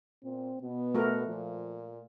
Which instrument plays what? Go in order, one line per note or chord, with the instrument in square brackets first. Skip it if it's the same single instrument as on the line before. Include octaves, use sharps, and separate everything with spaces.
[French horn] A#2 [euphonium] C4
[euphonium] B2 [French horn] B3
[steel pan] A3 F#4 A#4
[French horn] A#2 [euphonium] F3